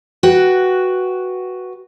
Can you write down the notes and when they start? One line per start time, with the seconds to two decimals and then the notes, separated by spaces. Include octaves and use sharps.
0.23 F#4 B4 G5